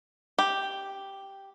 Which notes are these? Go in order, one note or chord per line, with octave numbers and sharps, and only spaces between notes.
G4